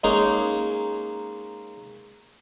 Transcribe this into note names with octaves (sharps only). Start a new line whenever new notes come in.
G#3 A#3 C#4 D#4 G#4